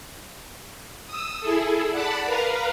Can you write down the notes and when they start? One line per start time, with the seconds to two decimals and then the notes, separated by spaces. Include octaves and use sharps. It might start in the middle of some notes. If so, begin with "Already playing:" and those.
1.07 D#6 E6
1.40 E4 G#4 A4
1.91 D5 F#5 A5 B5
2.25 A#4 B4 F5 A#5